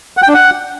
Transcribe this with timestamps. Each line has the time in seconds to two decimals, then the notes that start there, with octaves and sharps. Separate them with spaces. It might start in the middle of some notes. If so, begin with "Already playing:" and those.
0.17 F#5
0.23 G5
0.28 D4
0.34 F#5